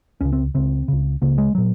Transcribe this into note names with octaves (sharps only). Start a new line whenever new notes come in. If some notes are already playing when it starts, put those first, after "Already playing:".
C#2 C#3 C#4
C4
C#2 C#3 C4
C#2 C#3
C#2 C#3 A#3
G#3
A#2 F#3